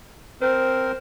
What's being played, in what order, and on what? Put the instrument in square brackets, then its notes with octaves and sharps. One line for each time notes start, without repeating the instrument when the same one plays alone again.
[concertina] C4 A#4 [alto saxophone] C5